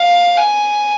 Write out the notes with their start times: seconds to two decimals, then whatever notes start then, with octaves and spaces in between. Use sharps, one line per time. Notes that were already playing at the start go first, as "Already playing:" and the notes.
Already playing: F5
0.37 G#5